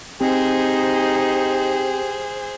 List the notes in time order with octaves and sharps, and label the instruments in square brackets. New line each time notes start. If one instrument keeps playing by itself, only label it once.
[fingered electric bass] C4 [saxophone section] D#4 [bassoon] G4 [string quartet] G#4 C5